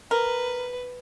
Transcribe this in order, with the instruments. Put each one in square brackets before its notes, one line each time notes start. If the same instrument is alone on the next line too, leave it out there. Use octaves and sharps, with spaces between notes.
[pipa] A#4 [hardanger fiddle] B4